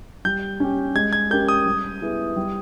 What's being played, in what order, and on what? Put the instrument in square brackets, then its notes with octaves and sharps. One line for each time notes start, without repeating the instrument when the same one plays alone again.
[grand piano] G3 [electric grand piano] G6
[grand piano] C#4 G4
[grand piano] G#3 [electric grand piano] G#6
[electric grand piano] G#6
[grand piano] C#4 G4 A#4 [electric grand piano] G6
[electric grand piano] D#6
[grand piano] G3
B3 E4 G#4
G3